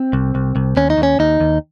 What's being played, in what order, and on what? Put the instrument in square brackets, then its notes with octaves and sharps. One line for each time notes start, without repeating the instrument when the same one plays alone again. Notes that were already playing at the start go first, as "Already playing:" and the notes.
Already playing: [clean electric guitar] C4
C2
C2
C2
D#2 C#4
D#4
D#2
C#4
D#2 D#4
D#2